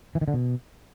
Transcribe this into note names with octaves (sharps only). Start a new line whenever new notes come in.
E3
D#3
D3
B2